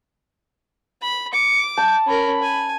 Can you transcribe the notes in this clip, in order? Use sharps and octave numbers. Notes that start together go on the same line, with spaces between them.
B5
D6 C#7
A5 G6
C#4 A#4 B5
G#5